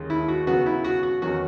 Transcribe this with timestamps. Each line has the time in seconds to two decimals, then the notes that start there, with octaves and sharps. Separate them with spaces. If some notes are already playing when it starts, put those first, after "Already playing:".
Already playing: D#2 D#3 G#3 C#4
0.10 E4
0.28 F#4
0.47 C#3 F#3 B3 F#4
0.66 E4
0.84 F#4
1.03 F#4
1.22 E2 D#3 F#3 C#4 F#4